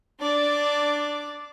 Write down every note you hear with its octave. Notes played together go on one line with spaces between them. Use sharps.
D4 D5